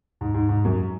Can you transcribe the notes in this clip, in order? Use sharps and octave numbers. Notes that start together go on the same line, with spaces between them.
G#2
G#2
G#2
F#2